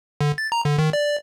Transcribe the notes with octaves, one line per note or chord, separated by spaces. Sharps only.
D3
A6
A#5
D3
D#3
D5